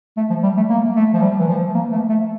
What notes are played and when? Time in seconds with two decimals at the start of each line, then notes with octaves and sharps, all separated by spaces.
0.17 A3
0.30 F3
0.43 G3
0.57 A3
0.70 A#3
0.96 A3
1.14 F3
1.22 G3
1.39 E3
1.48 F3
1.74 A#3
1.92 A3
2.09 A3